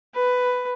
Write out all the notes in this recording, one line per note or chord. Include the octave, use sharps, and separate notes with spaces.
B4